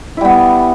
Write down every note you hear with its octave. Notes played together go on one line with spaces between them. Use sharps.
G3 B3 E4